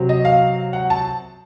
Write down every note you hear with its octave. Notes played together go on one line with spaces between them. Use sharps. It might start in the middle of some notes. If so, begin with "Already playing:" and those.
Already playing: C3 F#3 C4
D#5
F5
F#5
A5